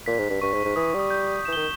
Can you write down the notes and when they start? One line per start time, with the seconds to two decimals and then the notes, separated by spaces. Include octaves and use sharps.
0.06 A#2 B6
0.18 G#2
0.30 G2
0.42 G2 C#6
0.53 G#2
0.65 G#2
0.76 E3 D#6
0.94 G3
0.99 D#6
1.10 G6
1.45 E3 E7
1.53 G7
1.56 D#3 E7